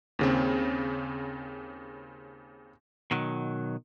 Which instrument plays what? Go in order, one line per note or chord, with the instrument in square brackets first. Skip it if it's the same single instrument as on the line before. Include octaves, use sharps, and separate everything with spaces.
[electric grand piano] D#2 C#3 C4
[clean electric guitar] B2 D#3 F#3